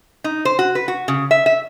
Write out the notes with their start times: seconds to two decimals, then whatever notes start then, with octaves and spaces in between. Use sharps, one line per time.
0.24 D#4
0.45 C5
0.59 F#4
0.75 B4
0.88 F#4
1.08 C#3
1.31 E5
1.46 E5